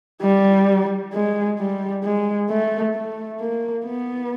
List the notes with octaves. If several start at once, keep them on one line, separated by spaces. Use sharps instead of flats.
G3
G#3
G3
G#3
A3
A3
A#3
B3